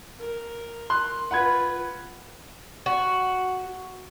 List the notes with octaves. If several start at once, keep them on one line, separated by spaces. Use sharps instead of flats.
A#4
C6 F#6
F4 B4 F#5 B5 G#6
F#4